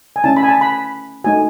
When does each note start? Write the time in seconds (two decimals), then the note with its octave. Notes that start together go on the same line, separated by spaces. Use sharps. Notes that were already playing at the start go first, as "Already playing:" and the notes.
0.16 G#5
0.24 A3 C#4 E4 A5
0.37 B5
0.43 G#5
0.48 A5
0.61 B5
1.24 A3 D#4 F#4 G#5